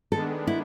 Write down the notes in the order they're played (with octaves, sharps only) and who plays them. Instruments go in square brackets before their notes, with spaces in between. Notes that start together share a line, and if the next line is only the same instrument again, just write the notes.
[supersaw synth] D#3 G#3 B3 D4 [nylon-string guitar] A4
[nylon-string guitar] E4